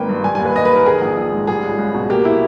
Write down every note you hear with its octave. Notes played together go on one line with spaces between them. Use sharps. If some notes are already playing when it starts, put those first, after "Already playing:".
Already playing: G#1 D#3 A#3 B4 G5
G2
G3 G#5
D#2 G#5
B4
D#2 D#5
B4
D#3 A#4
D#3 G#4
A#1
A#1
G#2
G3 G#4
C#2
C#2
B2
A#3 G4
E4